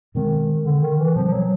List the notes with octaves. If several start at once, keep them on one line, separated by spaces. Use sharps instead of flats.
B2 D#3 G#3 C4
D3
D#3
E3
B2 F3 G3 C4
F3
F#3